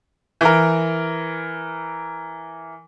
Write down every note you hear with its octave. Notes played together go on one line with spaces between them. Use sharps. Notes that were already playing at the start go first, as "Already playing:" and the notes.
E3 A#4